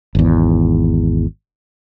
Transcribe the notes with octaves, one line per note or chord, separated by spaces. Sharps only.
G#1 E2